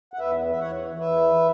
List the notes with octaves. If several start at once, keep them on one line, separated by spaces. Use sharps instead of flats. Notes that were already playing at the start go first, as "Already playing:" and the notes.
F#5
E2 B4 E5
E5
E3 C#5 F#5
E2 B4 E5